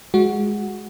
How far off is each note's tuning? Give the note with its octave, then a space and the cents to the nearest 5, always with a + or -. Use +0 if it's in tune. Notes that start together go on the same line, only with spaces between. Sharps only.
G#3 +0 F#4 +0